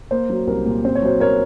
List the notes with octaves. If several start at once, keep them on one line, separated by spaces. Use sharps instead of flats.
A#3 C5
F#3
C2 A#4
A#2
C4 C5
C#5
F#3 C5
A#4 C#5